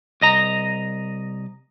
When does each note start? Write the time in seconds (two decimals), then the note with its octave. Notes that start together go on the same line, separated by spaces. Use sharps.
0.21 C2 D#5 A#5